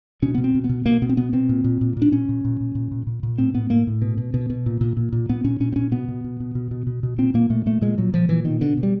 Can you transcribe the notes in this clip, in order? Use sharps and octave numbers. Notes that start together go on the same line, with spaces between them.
B2 C#4
B2 B3
C4
B2
B3
B2
B2 A#3
B2 B3
C4
B2 B3
B2 C4
A#2
A#2
A#2
A#2
D4
A#2 C#4
A#2
A#2
A#2
A#2
A#2
A#2
A#2
A2 C4
A2 B3
A2 A#3
A2
B2
B2
B2
B2
A#2
A#2
A#2
A#2
A#2 B3
A#2 C#4
A#2 C#4
C4
A#2 C#4
B2 B3
B2
B2
B2
B2
B2
B2
B2
A#2 C4
A#2 A#3
A#2 A3
A#2 A3
A#2 G#3
A#2 F#3
A#2 F3
A#2 E3
B2 D#3
B2 D3
B2
G3